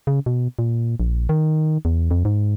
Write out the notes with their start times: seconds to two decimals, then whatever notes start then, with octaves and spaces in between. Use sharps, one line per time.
0.07 C#3
0.26 B2
0.59 A#2
1.00 A#1
1.29 D#3
1.85 E2
2.11 F2
2.25 G#2